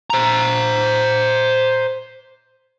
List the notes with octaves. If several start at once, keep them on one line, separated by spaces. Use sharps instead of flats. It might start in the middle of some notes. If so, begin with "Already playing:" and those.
C5 A#5